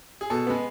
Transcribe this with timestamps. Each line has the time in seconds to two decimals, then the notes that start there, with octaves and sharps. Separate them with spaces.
0.21 G#4
0.30 B2 A4
0.47 G#3 B3